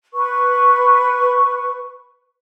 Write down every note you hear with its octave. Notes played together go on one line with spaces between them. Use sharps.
B4 C#6